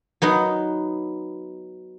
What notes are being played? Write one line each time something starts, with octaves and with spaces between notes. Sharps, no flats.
F#3 B3 D#4